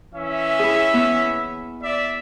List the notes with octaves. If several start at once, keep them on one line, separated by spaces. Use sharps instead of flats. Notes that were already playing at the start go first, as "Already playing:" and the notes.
E3 C#4 E5
E4 G#4
B3
D5 E5